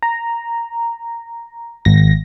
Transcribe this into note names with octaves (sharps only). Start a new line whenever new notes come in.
A#5
G#1 A#6